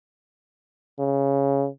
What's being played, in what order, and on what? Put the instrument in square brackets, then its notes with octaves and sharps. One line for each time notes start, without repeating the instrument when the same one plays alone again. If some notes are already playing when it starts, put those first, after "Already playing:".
[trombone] C#3